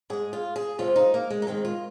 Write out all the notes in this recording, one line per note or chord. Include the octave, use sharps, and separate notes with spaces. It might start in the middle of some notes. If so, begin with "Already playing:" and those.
G#2 G#3 G#4
F4
G#4
F2 C3 F3 G#3 F4
D#4
A#3
G#3
D#4
G#2 D#3 G#3 C4
F4